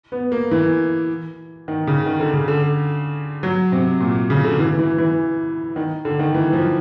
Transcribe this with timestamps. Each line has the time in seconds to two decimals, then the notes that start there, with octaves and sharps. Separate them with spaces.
0.12 B3
0.32 A#3
0.51 E3
1.68 D#3
1.87 C#3
2.06 D#3
2.20 D3
2.34 C#3
2.48 D3
3.43 F#3
3.72 C3
4.00 A#2
4.30 C#3
4.44 D3
4.59 E3
4.79 E3
4.98 E3
5.76 D#3
6.05 D3
6.19 D#3
6.34 E3
6.53 F3